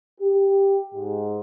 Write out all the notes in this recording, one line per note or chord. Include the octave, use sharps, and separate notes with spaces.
G4
G#2